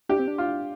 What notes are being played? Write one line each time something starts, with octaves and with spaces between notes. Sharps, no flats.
D4 G4
C4
D4
F4